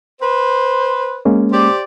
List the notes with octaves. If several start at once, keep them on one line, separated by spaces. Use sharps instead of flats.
B4 C5
G#3 A#3 C#4
G4 C5 D5